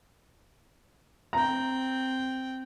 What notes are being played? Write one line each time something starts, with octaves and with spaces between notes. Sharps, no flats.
C4 G5 A#5